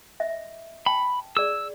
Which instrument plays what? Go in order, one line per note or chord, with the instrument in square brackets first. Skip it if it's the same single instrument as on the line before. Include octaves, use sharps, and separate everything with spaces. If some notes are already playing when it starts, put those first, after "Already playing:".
[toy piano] D#5 E5
[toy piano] G5 A5 [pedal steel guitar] B5
[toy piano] G#4 D5 [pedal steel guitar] E6